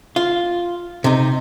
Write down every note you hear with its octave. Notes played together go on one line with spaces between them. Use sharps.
F4
C3 D#4